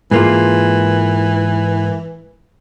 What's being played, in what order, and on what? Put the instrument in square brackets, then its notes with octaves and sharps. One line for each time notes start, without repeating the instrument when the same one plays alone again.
[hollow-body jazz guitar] G#2 A#3 F4 [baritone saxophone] E3